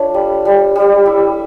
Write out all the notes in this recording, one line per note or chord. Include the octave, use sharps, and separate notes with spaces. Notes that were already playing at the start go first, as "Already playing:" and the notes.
Already playing: D4 F4 A4 C#5
G3
G3
G3
E4